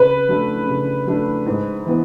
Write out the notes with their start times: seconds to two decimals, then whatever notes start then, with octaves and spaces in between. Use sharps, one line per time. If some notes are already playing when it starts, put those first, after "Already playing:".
Already playing: C#3 B4
0.28 F#3 A3 D4
0.67 C#3
1.07 F#3 A3 D4
1.46 G#2
1.85 E3 B3